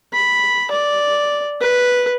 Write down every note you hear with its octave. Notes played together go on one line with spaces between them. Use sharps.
B5
D5
B4